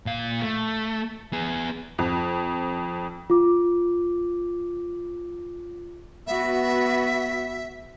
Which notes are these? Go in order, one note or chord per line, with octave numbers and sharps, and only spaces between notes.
A#2 F5
A3
B3 G#4
F2
F4 D6
B3 F#4 E5